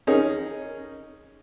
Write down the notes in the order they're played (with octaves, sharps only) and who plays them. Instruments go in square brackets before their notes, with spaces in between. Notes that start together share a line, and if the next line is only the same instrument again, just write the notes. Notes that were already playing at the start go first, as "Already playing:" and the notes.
[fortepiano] C#4 D#4 G#4 A#4